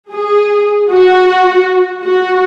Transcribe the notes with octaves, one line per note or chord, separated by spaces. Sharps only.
G#4
F#4
F#4